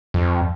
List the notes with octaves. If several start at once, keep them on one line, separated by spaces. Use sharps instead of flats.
F2